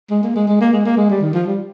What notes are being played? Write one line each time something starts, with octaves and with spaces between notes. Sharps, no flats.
G#3
A#3
G#3
G#3
A#3
G#3
A#3
G#3
G3
D#3
F3
G3